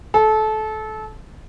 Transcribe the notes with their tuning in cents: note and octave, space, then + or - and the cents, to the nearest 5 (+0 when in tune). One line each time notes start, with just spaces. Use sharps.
A4 -25